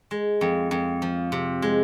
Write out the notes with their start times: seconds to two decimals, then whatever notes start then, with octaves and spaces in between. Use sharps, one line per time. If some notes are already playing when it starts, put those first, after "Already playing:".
0.11 G#3
0.41 F2
0.71 F2
1.02 F3
1.32 C3
1.62 G#3